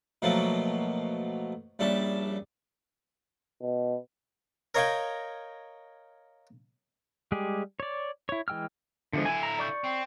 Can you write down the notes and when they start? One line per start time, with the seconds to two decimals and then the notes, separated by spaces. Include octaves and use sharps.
0.22 B2 F3 F#3 A3 A#3
1.79 A#1 G3 C#4 E5 A5
3.61 B2
4.75 A#4 C#5 D#5 F5 G5 G#5
7.32 G3 G#3 G4 G#4
7.80 C#5 D5
8.29 E4 C#5
8.48 E3 G#3 G5 E6 F6
9.13 E2 D3 F3 G#3
9.25 D3 E4 G#5
9.43 A#5
9.59 D5 C#6 G6
9.84 C4